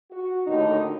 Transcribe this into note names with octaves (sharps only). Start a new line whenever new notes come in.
F#4
D#2 A2 D3 D#4